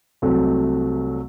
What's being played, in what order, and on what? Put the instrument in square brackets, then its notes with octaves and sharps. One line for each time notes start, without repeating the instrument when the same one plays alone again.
[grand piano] C2 C3 F#3 A3